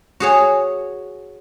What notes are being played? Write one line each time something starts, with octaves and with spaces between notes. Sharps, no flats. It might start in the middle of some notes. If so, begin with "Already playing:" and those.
F#4 G#4 C#5